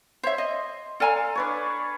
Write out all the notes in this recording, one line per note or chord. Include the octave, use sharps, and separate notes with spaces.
C5 C#5 E5 C6
D#5
A4 D5 F5 G#5 A#5
D4 B4 C#5